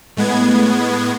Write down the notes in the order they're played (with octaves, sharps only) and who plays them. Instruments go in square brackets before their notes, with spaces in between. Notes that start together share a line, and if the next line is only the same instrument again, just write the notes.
[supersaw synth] A2 G#3 B3 G#6